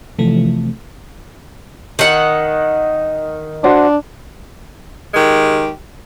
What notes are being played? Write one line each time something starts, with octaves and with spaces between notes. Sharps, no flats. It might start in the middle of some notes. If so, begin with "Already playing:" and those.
C3 E3 F3 A3
D#3 F#5
D4 F#4 C5 D5
D#3 G#3 G4